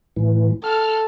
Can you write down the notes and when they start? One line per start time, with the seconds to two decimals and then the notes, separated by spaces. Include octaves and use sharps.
0.16 A2 E3
0.64 A4 F6